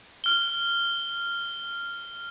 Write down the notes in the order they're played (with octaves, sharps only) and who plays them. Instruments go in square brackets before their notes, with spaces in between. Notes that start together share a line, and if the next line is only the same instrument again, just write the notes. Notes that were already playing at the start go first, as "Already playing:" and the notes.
[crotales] F6 G7